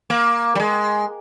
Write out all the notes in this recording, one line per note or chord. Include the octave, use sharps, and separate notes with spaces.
A#3
G3
G#3